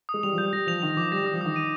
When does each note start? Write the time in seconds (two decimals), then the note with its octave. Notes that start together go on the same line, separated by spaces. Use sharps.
0.09 D#6
0.14 G#3
0.23 G3 F7
0.33 F3
0.38 G3 G6
0.53 G3 A#6
0.67 F3 F7
0.82 D#3 F7
0.97 F3 D6
1.12 G3 A#6
1.23 G3 D#6
1.34 F3
1.41 D#3 D#6
1.56 D#7